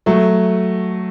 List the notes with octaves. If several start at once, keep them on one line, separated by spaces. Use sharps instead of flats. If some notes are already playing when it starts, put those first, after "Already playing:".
F#3 A3